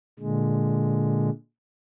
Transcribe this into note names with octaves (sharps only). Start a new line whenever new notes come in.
A#2 D3 G#3